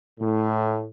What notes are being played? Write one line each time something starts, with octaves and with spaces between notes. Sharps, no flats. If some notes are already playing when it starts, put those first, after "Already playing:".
A2